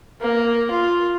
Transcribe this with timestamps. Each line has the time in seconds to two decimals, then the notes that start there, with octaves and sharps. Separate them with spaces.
0.21 A#3
0.71 F4